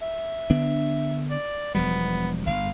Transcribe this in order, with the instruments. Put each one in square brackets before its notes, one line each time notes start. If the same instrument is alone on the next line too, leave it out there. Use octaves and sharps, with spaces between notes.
[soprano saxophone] E5
[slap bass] D3 B3 D4
[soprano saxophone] D5
[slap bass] E1 F3 G3 [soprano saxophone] B3
[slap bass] G1 [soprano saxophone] F5